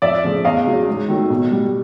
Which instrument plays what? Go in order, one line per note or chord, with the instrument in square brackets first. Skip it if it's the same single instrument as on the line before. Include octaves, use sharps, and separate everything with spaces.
[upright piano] F2 D5 E5
C#3 F3 A3
E2 D#5 F5
C#3 F#3
G#2
D#3 F#3 A3
B2
G3